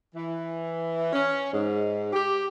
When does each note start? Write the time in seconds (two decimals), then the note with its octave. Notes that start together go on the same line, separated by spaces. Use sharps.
0.15 E3
1.12 C#4
1.52 G#2
2.12 G4